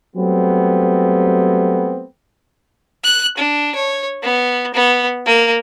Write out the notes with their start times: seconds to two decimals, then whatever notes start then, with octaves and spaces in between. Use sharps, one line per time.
0.16 F#3 G3 A3 B3 C4
3.04 F#6
3.38 D4
3.75 C#5
4.23 B3
4.74 B3
5.26 A#3